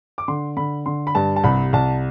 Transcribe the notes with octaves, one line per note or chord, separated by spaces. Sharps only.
D6
D3 C6
D3 B5
D3 C6
B5
G2 A5
A5
C2 B5
C2 A5